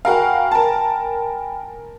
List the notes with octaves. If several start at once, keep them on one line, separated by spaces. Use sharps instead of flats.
F#4 A#4 F5 G5 G#5 B5
A#4 A5